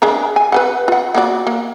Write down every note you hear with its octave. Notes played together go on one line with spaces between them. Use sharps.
G#3 D4 A#4
G#5
B4 C5 F#5
F4 F#5
A#3 F#4 D5
A#3